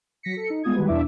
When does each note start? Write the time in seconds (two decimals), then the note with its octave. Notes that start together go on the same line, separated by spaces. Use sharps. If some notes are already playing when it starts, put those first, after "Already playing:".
0.23 F#3 A#6 B6 C#7
0.37 A4 C#7
0.50 D#4
0.63 G3 G#3 B3 F4 D#6 G#6
0.76 D#3 G3 G#3 F#4 B4
0.88 E2 B2 D4 E4 E5 D6